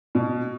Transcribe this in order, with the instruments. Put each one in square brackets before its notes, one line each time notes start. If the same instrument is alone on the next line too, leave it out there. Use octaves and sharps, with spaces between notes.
[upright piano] B2